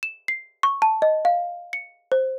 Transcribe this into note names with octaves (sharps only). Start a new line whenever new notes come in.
E7
C7
C#6
A5
D#5
F5
C#7
C5